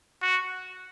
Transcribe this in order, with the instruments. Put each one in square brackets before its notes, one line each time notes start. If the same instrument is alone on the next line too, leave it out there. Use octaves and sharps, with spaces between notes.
[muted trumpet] F#4